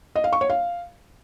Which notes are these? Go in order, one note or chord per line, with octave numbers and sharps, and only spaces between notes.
D#5
F5
C#6
C#5
F5